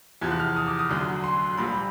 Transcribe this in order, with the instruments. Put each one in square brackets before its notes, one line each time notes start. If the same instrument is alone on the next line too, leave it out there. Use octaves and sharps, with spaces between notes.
[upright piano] E2 C3 F3 G#6
F#6
F6
D#6
D6
D#6
D2 D3 F#3
C6
A#1 A#2 G3 B5